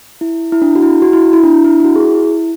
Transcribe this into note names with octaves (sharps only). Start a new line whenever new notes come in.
E4
E4
D4
F#4
E4
F#4
E4
E4
D4
D4
E4
E4
F#4
G#4
E4
E4